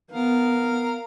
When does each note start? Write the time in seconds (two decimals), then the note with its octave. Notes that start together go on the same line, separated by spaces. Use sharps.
0.12 B3 A#4 F5